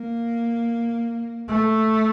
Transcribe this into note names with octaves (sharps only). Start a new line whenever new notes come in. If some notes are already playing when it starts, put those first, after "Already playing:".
Already playing: A#3
A3